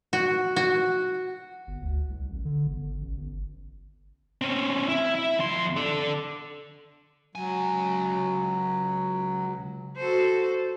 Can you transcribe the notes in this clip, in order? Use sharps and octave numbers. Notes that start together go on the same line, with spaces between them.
F#4
F#4
G1
D2
C2
A1
D3
G1
A1
G1
C4 C#4
E4
E4
F2 C6
A4 D5
C#2 F#3 G#5
F#4 A4 C5